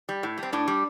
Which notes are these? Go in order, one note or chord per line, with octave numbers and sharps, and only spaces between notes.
G3
A2
G3
C4
A2 D4
G3